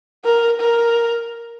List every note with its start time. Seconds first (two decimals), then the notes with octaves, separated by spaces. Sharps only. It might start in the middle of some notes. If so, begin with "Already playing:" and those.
0.25 A#4
0.60 A#4